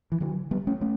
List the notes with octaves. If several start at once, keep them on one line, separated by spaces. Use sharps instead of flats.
E3
D3 F#3
G3 B3
A3 C#4
A3 C#4